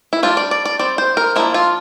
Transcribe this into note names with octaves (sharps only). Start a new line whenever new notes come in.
E4
G3 D4 F4
D5
D5
D5
G3 C4 D5
C5
A#4
F3 A#3 D4 E4
F4